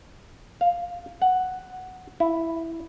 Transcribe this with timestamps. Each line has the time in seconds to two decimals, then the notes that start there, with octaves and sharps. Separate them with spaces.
0.61 F5
1.22 F#5
2.20 E4